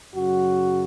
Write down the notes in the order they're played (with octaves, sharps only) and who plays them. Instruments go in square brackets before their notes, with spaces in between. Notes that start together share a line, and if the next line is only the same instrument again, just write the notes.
[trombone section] F#2 C#3 F#3 F#4